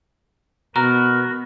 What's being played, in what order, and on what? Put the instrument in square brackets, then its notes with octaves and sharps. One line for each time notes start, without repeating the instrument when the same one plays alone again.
[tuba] B2 [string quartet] B3 [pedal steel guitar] F#4 A#4 [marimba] A#5